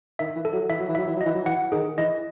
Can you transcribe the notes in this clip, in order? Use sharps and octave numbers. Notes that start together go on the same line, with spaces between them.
D#3 E5
E3
A4
F#3
E3 E5
F#3
E3
F#3 E5
E3
F#3
D#5
E3
F#3
E3 F#5
D#3 G#4
E3 D#5